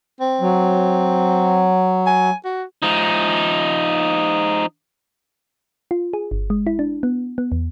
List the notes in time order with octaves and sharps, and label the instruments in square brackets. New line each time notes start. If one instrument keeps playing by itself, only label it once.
[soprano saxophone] C4
[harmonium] F#3
[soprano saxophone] G#5
F#4
[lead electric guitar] F3 D#4
[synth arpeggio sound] F4
G#4
G1
G#3
E4
D4
B3
B3
E2